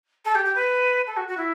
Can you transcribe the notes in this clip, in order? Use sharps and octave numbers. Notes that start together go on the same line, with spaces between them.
A4
G4
G4
B4
A4
F#4
F#4
E4